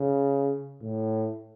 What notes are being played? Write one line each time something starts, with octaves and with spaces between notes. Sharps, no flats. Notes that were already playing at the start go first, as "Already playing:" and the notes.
Already playing: C#3
A2